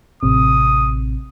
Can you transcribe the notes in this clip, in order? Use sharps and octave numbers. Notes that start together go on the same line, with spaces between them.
A1 C3 D#6